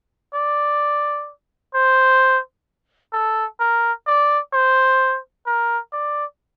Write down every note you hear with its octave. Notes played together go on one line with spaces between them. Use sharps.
D5
C5
A4
A#4
D5
C5
A#4
D5